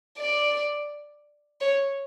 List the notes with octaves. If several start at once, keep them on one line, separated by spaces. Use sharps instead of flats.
D5
C#5